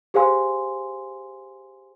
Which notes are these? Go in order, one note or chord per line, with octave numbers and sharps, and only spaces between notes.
G4 G#4 C5 F5 G#5 C6